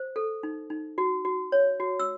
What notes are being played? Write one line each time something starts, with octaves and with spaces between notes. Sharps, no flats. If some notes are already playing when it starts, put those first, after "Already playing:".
Already playing: C5
A4
D#4
D#4
F#4
F#4
C#5
F#4
E6